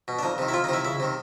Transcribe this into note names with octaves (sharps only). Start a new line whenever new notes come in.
B2
D4
F2 D#4
C3 D#3
E4
F2 F4
D#4
C3 D#3 E4
C#2 E4
C3 D#3